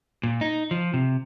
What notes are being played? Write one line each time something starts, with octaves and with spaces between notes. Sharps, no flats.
A#2
D#4
F3
C3